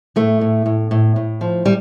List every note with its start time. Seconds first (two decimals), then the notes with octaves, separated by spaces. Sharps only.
0.16 A2 A3
0.41 A2
0.66 A2
0.91 A2
1.16 A2
1.41 F3
1.65 G3